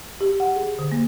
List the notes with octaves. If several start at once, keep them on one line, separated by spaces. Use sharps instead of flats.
G4
F#5
G#4
D3
A#3